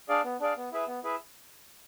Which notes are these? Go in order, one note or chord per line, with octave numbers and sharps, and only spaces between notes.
D4 G#4 D5 F5
B3
D4 G#4 D5 F5
B3
E4 G#4 B4 E5
B3
E4 G#4 B4 E5